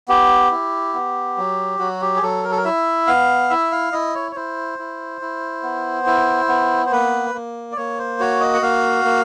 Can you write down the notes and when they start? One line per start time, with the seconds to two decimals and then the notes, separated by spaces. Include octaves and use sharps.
0.08 B3 G4
0.51 E4
0.94 B3
1.37 F#3
1.79 F#3 F#4
2.01 G4
2.16 G#4
2.22 F#3 A4
2.44 A#4
2.51 A4
2.57 A#4
2.65 E4 E5
3.07 B3 F5
3.50 E4 E5
3.72 F5
3.92 E4 D#5
4.15 C#5
4.32 C#5
4.36 E4 C5
4.79 E4
5.21 E4
5.63 B3
6.06 E4
6.48 B3
6.86 C5
6.92 A#3 B4
7.34 A#3
7.72 D5
7.76 A#3 C#5
7.99 C5
8.20 F#4 C#5
8.40 D#5
8.54 F#5
8.62 A#3 F5
9.05 A#3